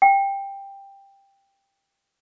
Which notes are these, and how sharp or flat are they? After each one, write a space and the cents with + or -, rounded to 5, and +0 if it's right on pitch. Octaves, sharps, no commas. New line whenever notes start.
G5 +10